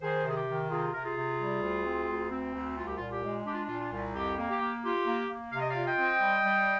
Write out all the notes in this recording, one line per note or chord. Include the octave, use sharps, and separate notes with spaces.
D#3 G#4 C5
C3 G#4
G4
D#3
C3 F4 G#4
C3 A#4
F4 G#4
C3
G3
D2
C4
D2
C4
D2
C2 F4
G4
A#2 F4
G4
G#3
D4 G4
F4
A#2 F4
F4
C2
F2 G4
A#3
G4
A#3
F4 G4
A#3
A#3
C3 F5
D#5
F4 D5 F5
D#5 G5
C4
G3
G3